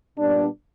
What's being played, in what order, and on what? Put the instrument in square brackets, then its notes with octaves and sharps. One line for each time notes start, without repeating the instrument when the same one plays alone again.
[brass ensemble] A#2 G3 B3 D4